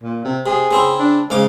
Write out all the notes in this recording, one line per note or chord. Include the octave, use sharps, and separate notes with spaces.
A#2
C3
C3 G#4
C#3 C4 E4
D4
G#2 C#3 F5 D6